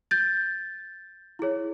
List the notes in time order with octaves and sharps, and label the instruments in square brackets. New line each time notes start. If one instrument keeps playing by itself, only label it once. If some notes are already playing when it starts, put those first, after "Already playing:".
[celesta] G6 A6
E4 G#4 C#5